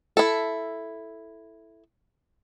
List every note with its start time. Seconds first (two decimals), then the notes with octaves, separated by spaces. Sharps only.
0.17 E4 A4